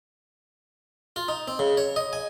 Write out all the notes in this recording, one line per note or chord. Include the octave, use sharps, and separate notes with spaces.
F4
D#4
C4
C#3
C#5
D#5
G#5